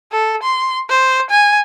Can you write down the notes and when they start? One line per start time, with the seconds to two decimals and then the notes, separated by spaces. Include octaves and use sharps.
0.12 A4
0.43 C6
0.90 C5
1.31 G#5